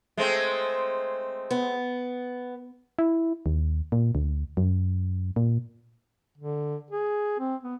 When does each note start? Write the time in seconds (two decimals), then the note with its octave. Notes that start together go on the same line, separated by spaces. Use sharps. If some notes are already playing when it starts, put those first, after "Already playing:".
0.17 G#3 A3 C4
1.51 B3
2.99 E4
3.46 D#2
3.92 A#2
4.15 D2
4.57 F#2
5.36 A#2
6.38 D3
6.91 G#4
7.39 C4
7.64 B3